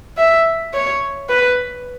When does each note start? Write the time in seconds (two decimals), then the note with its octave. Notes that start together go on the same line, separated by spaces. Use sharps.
0.17 E5
0.73 C#5
1.29 B4